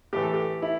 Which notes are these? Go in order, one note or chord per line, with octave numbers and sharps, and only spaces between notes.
A2 E3 G4
A4
G4
E4